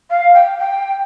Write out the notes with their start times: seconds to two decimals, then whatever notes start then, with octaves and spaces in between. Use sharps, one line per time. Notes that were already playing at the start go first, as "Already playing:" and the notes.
0.10 F5
0.34 G5
0.59 G5